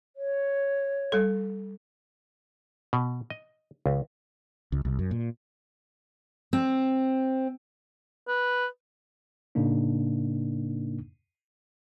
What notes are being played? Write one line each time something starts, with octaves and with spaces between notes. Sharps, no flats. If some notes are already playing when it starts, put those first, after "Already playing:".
C#5
G3 A4
B2
D#5
C#2
C#2
C2
F#2
A#2
C4
B4
A2 C#3 A#3 D4 D#4